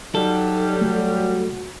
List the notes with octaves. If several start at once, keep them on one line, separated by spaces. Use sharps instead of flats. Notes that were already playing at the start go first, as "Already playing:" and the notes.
F#3 G3 D#4 A4
A3 F#4